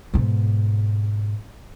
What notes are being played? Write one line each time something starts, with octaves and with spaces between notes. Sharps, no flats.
G#2 B2